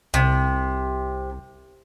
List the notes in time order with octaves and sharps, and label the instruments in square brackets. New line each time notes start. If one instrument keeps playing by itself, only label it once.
[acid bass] C2 [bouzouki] C3